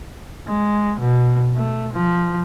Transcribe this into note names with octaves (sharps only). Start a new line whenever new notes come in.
G#3
B2
A3
F3